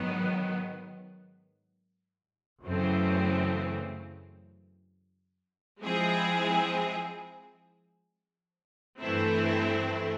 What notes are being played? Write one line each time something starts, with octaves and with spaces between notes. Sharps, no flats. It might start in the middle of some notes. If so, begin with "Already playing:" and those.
Already playing: G#2 D#3 F#3 B3
F#2 C#3 E3 A3 C4
F3 G#3 C4 E4 G#4
G2 E3 A3 C4 E4